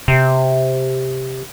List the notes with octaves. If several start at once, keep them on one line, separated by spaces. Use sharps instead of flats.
C3